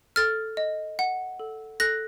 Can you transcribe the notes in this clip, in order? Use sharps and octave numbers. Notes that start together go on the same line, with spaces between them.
A4 F6 A6
D#5
F#5
A4
A4 F#6 A#6